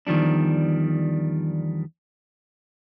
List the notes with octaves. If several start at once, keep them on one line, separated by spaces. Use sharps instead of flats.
E2 D#3 F3 G3 D4